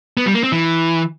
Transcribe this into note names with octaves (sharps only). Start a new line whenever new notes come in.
B3
G3
A#3
C4
E3